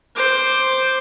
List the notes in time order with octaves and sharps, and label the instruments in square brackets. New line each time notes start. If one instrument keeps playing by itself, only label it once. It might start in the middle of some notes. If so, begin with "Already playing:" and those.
[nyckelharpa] C5 D6